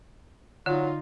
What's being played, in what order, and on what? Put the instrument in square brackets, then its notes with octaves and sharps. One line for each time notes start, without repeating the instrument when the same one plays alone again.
[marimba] D3 [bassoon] F#3 [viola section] D#4 F4